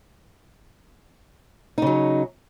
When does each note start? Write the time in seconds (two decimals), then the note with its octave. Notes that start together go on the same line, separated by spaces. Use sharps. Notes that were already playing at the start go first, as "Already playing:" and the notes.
1.78 D#4
1.82 C#3
1.87 F#3